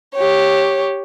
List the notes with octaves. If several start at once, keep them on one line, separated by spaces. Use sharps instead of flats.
G4 C#5